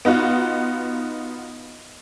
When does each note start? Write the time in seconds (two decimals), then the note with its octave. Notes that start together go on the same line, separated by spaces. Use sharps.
0.05 B3 D#4 F4 F#4